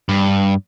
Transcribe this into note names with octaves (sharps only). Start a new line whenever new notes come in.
G2